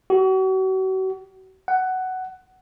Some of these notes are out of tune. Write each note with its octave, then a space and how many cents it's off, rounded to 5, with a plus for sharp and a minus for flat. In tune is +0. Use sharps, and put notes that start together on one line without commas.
F#4 +40
F#5 +10